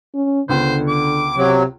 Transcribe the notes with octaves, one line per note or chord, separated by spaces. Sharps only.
C#4
C#2 D3 B3 C5
D6
C3 F#3